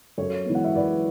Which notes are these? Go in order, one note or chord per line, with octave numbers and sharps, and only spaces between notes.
F#2 A4 C#5
E3 G#3 B3
F#5
E5
F#2 B4 D5